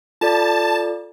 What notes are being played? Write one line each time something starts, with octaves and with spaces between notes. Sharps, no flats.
F4 A4 D5 A5